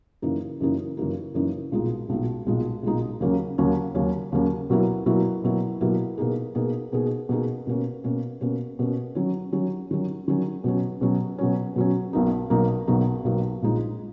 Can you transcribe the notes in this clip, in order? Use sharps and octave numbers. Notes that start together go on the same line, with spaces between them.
F#2 C#3 E3 A#3 D#4
F#2 C#3 E3 A#3 D#4
F#2 C#3 E3 A#3 D#4
F#2 C#3 E3 A#3 D#4
B1 A#2 G#3 D#4
B1 A#2 G#3 D#4
B1 A#2 G#3 D#4
B1 A#2 G#3 D#4
D#2 C#3 F#3 A#3 C#4
D#2 C#3 F#3 A#3 C#4
D#2 C#3 F#3 A#3 C#4
D#2 C#3 F#3 A#3 C#4
B2 F#3 A#3 E4
B2 F#3 A#3 E4
B2 F#3 A#3 E4
B2 F#3 A#3 E4
B2 A#3 D#4 G#4
B2 A#3 D#4 G#4
B2 A#3 D#4 G#4
B2 A#3 D#4 G#4
B2 A#3 C#4
B2 A#3 C#4
B2 A#3 C#4
B2 A#3 C#4
D#3 F#3 C#4
D#3 F#3 C#4
D#3 F#3 C#4
D#3 F#3 C#4
B2 F#3 C#4
B2 F#3 C#4
B2 F#3 C#4
B2 F#3 C#4
B1 B2 F#3 A#3 D#4
B1 B2 F#3 A#3 D#4
B1 B2 F#3 A#3 D#4
B1 B2 F#3 A#3 D#4
A#1 A#2 G#3 D#4